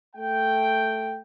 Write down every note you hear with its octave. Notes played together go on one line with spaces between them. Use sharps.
A3 G5